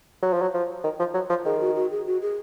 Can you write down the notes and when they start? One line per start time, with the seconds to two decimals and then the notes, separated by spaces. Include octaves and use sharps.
0.22 F#3
0.33 F3
0.42 F#3
0.54 F3
0.84 D#3
0.99 F3
1.14 F#3
1.30 F3
1.45 D#3 G#4
1.60 F#4
1.76 F#4
1.91 G#4
2.06 F#4
2.22 G#4